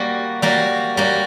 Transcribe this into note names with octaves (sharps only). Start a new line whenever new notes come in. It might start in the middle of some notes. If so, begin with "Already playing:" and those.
Already playing: G3 A#3 F#4
G3 A#3 F#4
G3 A#3 F#4